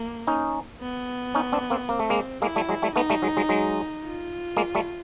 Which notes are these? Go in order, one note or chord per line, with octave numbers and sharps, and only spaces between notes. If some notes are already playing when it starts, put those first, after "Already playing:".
Already playing: A#3
C#4 D#4
B3
C#4 D#4
C4 D4
A#3 C4
A#3 C4
A3
G#3 A#3
G#3 A#3 E4
G3 A3
F#3 G#3
G3 A3
A3 B3 D#4
G3 A3
F#3 G#3
F#3 G#3
F#3 G#3
F4
G#3 A#3
G3 A3